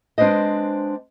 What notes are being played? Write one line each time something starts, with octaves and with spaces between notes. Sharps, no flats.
G#3 C4 D4 B4 C5 D#5